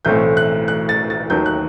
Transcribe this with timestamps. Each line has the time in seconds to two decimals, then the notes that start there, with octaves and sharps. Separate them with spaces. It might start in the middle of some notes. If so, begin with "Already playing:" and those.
0.05 B1 A2 E3 A3 C4 G6
0.37 F#6
0.68 F#6
0.89 A6
1.10 A6
1.30 D#2 D#3 F#3 G6
1.46 F#6